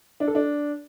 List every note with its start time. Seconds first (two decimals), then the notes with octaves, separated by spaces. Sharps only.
0.20 D4
0.28 A4
0.35 D4